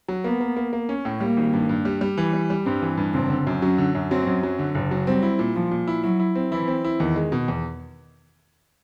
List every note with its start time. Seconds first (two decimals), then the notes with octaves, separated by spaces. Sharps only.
0.08 F#3
0.24 A#3 B3
0.41 A#3
0.57 A#3
0.73 A#3
0.89 C#4
1.05 A2
1.20 G3 A#3
1.37 G#1
1.53 G2
1.69 G2
1.85 G3
2.01 G3
2.17 E3
2.33 G3
2.50 G3
2.65 G2 C4
2.82 E3
2.97 G2
3.14 F#1 C4
3.30 D3
3.47 F#2
3.62 F#3 C#4
3.78 D3
3.95 F#2
4.11 F#3 C4
4.27 F#2
4.43 F#3
4.59 D3
4.75 F#1
4.91 F#3
5.07 G3 C4
5.23 E4
5.39 A#2
5.55 A#2 F3
5.71 A#2
5.88 E4
6.03 F#3 E4
6.20 E4
6.35 C4
6.52 E3 E4
6.68 C4
6.85 E4
7.00 E2 D#3
7.16 G#3
7.32 B2
7.48 E2